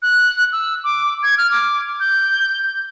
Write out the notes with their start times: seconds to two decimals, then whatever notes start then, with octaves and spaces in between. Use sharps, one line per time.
0.02 F#6
0.52 E6
0.84 D6
1.23 G#6
1.38 F6
1.51 D6
2.00 G6